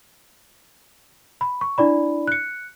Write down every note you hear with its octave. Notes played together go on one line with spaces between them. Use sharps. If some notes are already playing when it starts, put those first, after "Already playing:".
B5
C#6
D4 E4 D5 B5
F#6 C#7